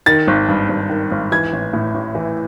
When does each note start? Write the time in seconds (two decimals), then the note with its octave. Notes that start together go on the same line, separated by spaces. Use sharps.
0.06 D#3 A6
0.27 G#1
0.48 G2
0.69 G#1
0.89 D#3
1.11 G#1
1.32 E3 G#6
1.53 A1
1.73 A2
1.94 A1
2.15 E3